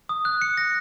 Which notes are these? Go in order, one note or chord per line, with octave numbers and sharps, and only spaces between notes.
D#6
F#6
C#7
A#6